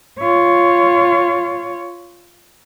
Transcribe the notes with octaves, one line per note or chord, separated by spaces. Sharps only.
F4 C#5